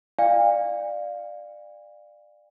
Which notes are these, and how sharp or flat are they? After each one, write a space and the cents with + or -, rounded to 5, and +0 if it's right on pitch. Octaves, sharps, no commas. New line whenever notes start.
D5 +25 F5 +0 G#5 -45